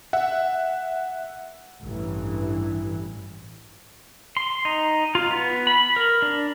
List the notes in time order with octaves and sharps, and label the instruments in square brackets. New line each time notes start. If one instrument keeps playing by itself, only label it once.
[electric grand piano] E5 F#5
[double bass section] A1 G2 E3
[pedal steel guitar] C6
D#4
F4
B3
B5
A#4
D4